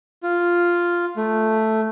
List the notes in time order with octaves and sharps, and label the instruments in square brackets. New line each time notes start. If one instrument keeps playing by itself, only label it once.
[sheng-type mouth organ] F4
A3